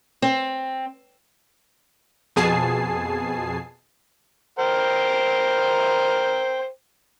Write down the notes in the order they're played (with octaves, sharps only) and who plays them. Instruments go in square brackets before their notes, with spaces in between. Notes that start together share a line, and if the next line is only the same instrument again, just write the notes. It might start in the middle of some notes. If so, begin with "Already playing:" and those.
[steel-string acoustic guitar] C4
[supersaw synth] F2 B2 G#4 G#5 A5 C7
[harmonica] A#4 C5 G5